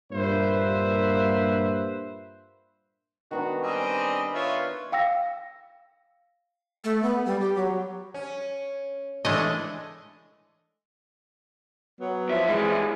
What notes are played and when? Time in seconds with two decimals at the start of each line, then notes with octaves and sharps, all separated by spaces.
0.12 G2 A#2 A#3 B4 C5 E5
3.31 D#3 B3 D4 F#4
3.63 G3 C4 D#5 G#5
4.34 F4 B4 C#5 E5
4.92 F5 G5 E6 A#6
6.84 A3
7.02 B3
7.26 G3
7.41 G4
7.56 F#3
8.14 C#4
9.25 E3 G#3 A3 C#4 D4 D#5
12.00 F#3 B3
12.29 F2 F3 B3 E4 E5
12.48 G2 E3 G#3